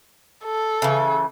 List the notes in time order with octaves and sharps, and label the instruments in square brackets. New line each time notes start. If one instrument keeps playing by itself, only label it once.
[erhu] A4
[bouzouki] C#3 E3